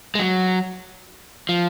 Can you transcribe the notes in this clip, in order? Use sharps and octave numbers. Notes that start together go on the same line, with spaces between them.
G#3
F#3
F3